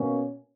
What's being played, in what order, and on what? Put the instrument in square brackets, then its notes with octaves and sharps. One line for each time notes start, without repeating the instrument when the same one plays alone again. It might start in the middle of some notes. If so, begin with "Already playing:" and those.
Already playing: [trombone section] B2 A#3 C#4